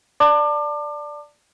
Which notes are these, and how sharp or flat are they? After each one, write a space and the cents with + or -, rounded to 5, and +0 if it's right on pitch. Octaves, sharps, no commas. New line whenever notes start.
D5 +0 A5 +35 D6 +30